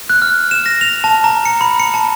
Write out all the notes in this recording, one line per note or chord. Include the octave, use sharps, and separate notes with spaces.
F#6
F6
E7
A#6
F7
A5
A#5
C#7
B5
C#7
A5